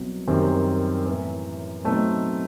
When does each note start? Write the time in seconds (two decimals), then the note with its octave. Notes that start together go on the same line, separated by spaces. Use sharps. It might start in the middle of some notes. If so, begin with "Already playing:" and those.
Already playing: C2 B2 F#3
0.28 F#2 D#3 G3 C4
1.06 A2 E3 B3
1.84 B2 F#3 A3 C4 D#4